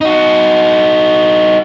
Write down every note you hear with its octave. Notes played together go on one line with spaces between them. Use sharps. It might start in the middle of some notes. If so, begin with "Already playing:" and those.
D#4 F#4